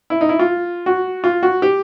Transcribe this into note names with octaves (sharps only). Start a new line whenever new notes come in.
E4
D#4
E4
F4
F#4
F4
F#4
G4